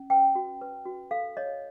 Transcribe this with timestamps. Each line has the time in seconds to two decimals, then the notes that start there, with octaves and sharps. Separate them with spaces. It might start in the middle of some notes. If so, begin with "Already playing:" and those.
Already playing: C#4
0.10 B4 G5
0.35 F#4
0.61 B4
0.85 F#4
1.11 A4 F5
1.37 C#5 D#5